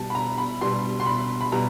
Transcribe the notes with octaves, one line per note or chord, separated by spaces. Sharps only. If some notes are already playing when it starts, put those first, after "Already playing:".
Already playing: B2 G3 A5
B5
A#5
B5
B2 G3 C6
C6
B5
B5
B2 G3 A#5